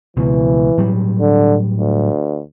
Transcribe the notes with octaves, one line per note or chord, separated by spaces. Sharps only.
C#2 B2 E3
A2 F#3 G3
D3
D2